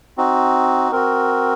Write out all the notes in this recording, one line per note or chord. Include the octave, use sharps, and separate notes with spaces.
C4 D#4 F#4
C4 F#4 A#4